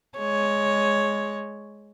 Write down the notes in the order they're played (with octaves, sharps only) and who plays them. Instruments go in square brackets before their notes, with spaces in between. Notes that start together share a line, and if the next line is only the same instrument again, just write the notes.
[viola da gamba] G#3 C#5